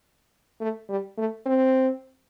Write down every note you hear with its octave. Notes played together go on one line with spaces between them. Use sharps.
A3
G3
A3
C4